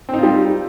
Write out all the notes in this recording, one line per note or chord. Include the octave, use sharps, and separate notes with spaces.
G3 C4 D#4 F4